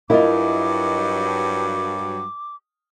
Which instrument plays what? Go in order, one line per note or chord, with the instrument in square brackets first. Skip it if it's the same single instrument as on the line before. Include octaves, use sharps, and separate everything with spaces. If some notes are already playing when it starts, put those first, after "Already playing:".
[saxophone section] G2 F#3 [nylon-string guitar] E4 F4 [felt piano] A#4 D#5 [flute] D6